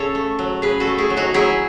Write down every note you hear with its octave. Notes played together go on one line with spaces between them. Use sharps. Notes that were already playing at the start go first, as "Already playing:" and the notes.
Already playing: C#3 A4 C#5
A3
F#3
C#3 G#4 B4
F#4 A4
A3
E4 G#4
F#3
D#4 F#4
F#3 E4 G#4